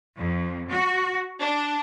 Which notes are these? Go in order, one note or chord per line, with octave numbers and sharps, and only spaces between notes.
F2
F#4
D4